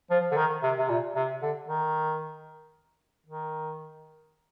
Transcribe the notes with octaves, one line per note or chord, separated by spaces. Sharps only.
F3
D3
D#3
C3
C3
A#2
C3
D3
D#3
D#3